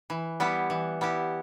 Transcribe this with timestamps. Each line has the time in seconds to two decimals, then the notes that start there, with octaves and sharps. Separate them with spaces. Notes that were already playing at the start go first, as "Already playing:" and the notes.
0.10 E3
0.40 G3 B3 E4 G4
0.70 E3
1.01 G3 B3 E4 G4